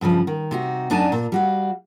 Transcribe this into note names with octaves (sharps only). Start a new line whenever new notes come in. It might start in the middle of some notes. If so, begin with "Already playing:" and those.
G2 C#3 E3 F3
D#3
C3 D#4 F#4
F#2 D4 D#4 D5 G#5 A5
A#2
G3 F#4 F5